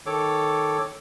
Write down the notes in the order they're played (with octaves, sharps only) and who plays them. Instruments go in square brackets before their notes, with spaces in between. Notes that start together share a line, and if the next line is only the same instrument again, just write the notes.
[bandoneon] D#3 A4 C#5 D6